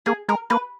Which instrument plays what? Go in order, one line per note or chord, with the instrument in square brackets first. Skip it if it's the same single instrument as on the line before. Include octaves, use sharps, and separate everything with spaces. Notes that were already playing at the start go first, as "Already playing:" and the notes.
[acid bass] A#3 [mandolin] G#4
[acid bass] G#3 [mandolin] A#4
[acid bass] A#3 [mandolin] B4